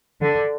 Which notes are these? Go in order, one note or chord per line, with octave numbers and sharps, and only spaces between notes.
D3